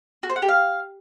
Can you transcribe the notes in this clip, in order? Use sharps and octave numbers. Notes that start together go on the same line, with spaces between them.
F#4
C5
F#5
G4
F5